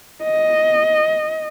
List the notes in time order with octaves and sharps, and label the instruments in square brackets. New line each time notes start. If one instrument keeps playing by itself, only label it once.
[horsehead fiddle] D#5